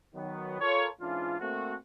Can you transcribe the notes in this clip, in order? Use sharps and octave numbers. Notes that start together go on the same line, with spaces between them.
D#3 F#3 B3
F4 A4 A#4 C#5
G#2 E3 C#4 D4 F4
A3 A#3 C4 F#4